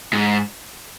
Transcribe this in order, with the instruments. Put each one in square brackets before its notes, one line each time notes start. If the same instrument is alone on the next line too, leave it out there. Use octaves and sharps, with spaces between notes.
[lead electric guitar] G#2